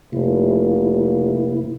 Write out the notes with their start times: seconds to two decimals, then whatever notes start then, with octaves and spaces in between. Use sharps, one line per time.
0.13 F1 C3 A#3 E4